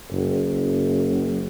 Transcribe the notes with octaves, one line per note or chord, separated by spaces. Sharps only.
F#1